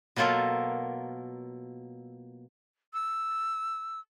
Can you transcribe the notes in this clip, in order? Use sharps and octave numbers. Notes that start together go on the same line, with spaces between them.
B2 F#3 A#3 F4 A4 A#4
E6